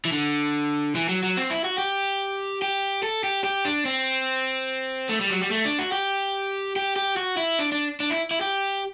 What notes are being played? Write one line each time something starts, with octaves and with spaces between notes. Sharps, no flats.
E3
D3
E3
F#3
F#3
C4
E4
F#4
G4
G4
A4
G4
G4
D4
C4
A3
G3
F#3
G3
A3
D4
F#4
G4
G4
G4
F#4
E4
D4
D4
D4
E4
E4
G4